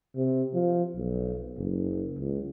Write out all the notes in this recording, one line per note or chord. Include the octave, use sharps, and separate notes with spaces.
C3
F3
B1
F#1
C#2